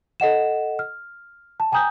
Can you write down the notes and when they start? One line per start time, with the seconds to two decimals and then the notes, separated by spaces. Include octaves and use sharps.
0.20 A4 D#5 F#5 E7
0.79 F6
1.60 A5
1.72 G5 G#5 A#5 D#6 G6